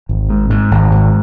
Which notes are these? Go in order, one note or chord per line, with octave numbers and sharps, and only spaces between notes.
G#1
G#2
G#2
G#1
G#2